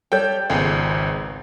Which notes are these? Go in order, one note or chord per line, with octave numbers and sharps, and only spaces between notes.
G3 A4 C#5 G5 G6
G#1 C#2 B3 G#4 G#5